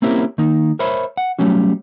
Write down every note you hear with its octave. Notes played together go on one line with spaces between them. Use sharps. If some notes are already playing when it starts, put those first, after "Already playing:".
A#3 C4 C#4 E4 G4 A#4
D#3 A#3 D#4
A#4 C5 C#5 E5 B5
F#5
F#3 G3 A3 C#4 F#4